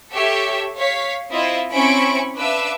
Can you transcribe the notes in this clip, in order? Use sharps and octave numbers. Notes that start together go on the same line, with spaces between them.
G4 A4 C#5 E5
C#5 F5 B6
C4 E4 F4 D#5
C4 C#4 E4 B5 C#6 D7
D4 B4 E5 F5 D6 E6